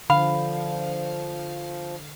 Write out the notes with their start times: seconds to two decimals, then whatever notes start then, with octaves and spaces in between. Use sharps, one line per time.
0.10 D3 F3 F5 B5